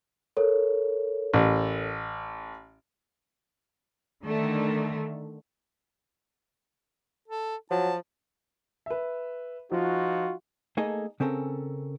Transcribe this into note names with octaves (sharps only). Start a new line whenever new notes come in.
A4 A#4 C#5
A1
D3 D#3 A3
A4
F3 F#3 A5
B4 E5
F3 D#4 F4 F#4
A3 A#3 D#4 G#4 A4 D#5
C#3 C4 C#4 A4 A#4